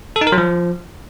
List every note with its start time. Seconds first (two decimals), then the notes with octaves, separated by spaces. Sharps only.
0.16 A4
0.21 D#4
0.27 A#4
0.32 F#3
0.38 F3